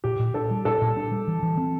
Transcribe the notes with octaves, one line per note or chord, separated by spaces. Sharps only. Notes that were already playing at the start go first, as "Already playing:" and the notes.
A#2 G4
A#2
D4 A4
G3
A#2 A4
A#2
D4
G3
E3
E3
C4